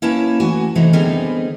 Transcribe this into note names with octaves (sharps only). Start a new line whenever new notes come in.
A#3 C#4 E4 B4 C#5 A5
E3 A3 F#4 G#5
C3 E3 F#3 A3 D#4
D3 G3 B3 C4 D#4 G#4